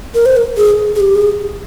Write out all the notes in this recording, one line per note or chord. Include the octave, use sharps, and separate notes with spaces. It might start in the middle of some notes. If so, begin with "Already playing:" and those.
A#4
C5
A#4
G#4
G#4
G4
G#4